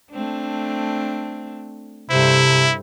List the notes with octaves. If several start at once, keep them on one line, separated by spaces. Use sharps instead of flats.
A3 C4 D4
G2 C3 E4 A4 C5